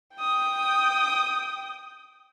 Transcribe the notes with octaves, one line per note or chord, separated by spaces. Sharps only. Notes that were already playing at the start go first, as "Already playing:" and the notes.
G5 D#6